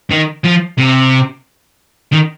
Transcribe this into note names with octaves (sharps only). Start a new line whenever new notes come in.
D#3
F3
C3
D#3